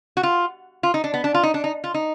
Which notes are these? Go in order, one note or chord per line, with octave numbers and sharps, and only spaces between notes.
F#4
F4
F4
D#4
D4
B3
D4
F4
D#4
D4
D#4
F4
D#4